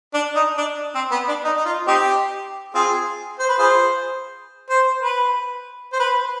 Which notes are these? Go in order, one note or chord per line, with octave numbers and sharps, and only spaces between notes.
D4
D#4
D4
C4
B3
D4
D#4
D#4
F4
C4 D#4 G4
C4 F4 G#4
C5
B4
F4 G#4 C5
C5
B4
C5
B4